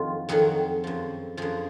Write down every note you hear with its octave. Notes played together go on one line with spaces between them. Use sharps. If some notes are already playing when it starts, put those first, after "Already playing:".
Already playing: F2 D#3 F#3 F4
F2 D#3 F#3 G#4
F#2 F3
F#2 F3 G#4